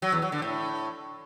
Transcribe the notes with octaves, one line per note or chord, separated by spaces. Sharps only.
F#3
E2
F#3
D3
A2